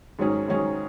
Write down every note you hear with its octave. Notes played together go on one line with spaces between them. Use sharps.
G#2 D#3 F#3 C#4 G#4
G#2 D#3 F#3 C#4 G#4